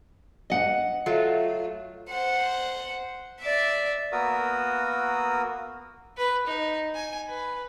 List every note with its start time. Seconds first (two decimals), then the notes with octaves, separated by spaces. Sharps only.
0.50 D#5 F#5
1.06 F#3 A3 F4
2.10 C5 F#5
3.41 D5 E5
4.12 A#3 B3 F#4 A#4 D#6 E6
6.18 B4
6.47 D#4
6.95 G#5
7.29 B4